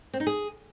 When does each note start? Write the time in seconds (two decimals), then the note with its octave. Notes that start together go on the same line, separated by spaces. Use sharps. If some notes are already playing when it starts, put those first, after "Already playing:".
0.14 C4
0.20 D#4
0.27 G#4